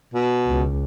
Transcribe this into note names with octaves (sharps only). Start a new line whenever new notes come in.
B2
C#2